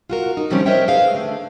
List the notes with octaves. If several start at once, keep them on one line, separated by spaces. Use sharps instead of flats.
F4 F#4 A#4
D#4
C3 D#3 F3 G3 C4 C#4
A#4 C5 C#5 D#5 E5 G5
G#4 B4 C5 D#5 F5
D3 A3